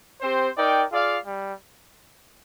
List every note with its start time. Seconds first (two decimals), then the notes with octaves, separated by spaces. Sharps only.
0.21 C4 G4 C5
0.56 D#4 A#4 D5 G5
0.90 F4 G#4 D5 F5
1.26 G3